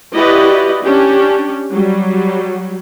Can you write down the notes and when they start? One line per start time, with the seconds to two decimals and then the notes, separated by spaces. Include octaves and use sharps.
0.14 E4 F#4 G4 B4 D5 D#5
0.82 C#4 D4 G4
1.73 F#3 G3